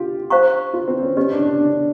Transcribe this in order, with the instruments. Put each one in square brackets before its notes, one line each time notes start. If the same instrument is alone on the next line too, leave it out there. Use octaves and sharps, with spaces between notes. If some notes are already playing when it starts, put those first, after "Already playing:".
Already playing: [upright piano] F4 G4
[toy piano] C5 F5 A#5 C#6
[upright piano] F4
C4
C#4
[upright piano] C#4 [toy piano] G4 B4 D#5
[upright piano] D4
D4
D4